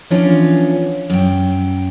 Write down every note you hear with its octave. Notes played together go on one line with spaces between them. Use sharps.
E3 F3 B3 C#4 D4 F4
F#2 G5